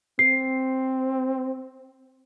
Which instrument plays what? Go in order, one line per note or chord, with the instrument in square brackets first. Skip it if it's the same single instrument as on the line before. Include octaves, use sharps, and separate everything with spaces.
[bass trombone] C4 [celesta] C7